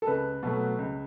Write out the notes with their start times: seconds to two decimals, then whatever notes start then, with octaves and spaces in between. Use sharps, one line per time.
0.02 A4
0.07 C#2 B4
0.43 B2 F#3 A3
0.78 C#2